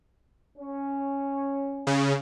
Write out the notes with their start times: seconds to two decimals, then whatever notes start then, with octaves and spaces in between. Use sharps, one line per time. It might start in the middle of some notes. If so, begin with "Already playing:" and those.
0.56 C#4
1.87 C#3